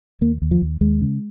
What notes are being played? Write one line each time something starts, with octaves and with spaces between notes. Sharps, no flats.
D#2 A#3
D#2
F3
D#2
D#2 G#3
C#3